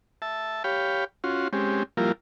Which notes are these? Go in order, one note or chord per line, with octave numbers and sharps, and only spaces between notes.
E5 A5
G4 C#5 F5 G5 B5
C#4 F4 F#4 C6
G#3 C4 C#4 G4
F3 G3 A#3 E4 F4 A#4